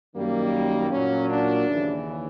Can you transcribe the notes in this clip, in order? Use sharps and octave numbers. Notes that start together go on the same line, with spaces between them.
F#2 D#3 G3 A#3
A#2 F#3 A#3 C#4
D4
D#2 C#3 E3